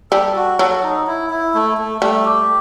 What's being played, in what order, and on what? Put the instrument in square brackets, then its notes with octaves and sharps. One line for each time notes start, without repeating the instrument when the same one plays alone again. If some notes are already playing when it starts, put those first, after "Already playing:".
[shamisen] G3 [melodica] A4
[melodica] F#4
[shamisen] F#3 [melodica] A4
[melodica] D#4
E4
E4
A3
A3
[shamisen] G3 [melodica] A3
[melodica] G4